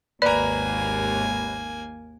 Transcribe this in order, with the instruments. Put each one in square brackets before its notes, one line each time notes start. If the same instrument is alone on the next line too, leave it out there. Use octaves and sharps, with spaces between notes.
[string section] G#1 D#2 [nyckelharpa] A#3 G#5 [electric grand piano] B4 A#5 [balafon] D5